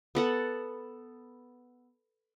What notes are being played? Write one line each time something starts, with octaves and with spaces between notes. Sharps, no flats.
B3 A4 F#5